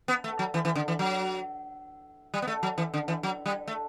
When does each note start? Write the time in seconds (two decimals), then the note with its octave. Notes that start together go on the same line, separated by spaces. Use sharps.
0.08 B3
0.24 A3
0.39 F#3
0.54 E3
0.65 E3
0.76 D3
0.88 E3
0.99 F#3
2.34 G3
2.42 B3
2.48 A3
2.63 F#3
2.78 E3
2.94 D3
3.08 E3
3.23 F#3
3.46 G3
3.68 A3